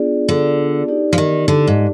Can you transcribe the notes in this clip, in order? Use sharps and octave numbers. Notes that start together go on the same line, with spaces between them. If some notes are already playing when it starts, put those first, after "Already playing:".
Already playing: B3 D4 F4 G#4 D5
D3
D#4 G4 D5
F3
D#3
D3
G#2